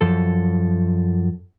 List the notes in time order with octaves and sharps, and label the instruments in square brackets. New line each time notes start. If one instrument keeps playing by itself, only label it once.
[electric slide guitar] F#2 F3 A4